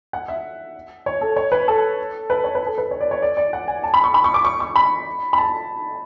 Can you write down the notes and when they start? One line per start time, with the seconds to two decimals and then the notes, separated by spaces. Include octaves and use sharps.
0.13 F#5
0.28 E5
1.06 C#5
1.21 A4
1.36 C#5
1.52 B4
1.68 A4
2.30 B4
2.44 C#5
2.55 B4
2.67 A4
2.78 B4
2.91 C#5
3.01 D5
3.11 C#5
3.22 D5
3.37 D5
3.53 F#5
3.68 G#5
3.83 A5
3.94 B5
4.04 C#6
4.14 B5
4.24 C#6
4.34 D6
4.45 C#6
4.60 C#6
4.76 B5
5.33 B5
5.38 A5